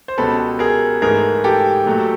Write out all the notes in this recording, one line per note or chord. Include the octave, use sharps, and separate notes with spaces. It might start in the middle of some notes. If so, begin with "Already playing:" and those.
C5
C#2 B2 G3 A4 B4
G#4 A#4
G#2 E3 A3 G#4 A#4
G4 A4
A#2 F#3 A3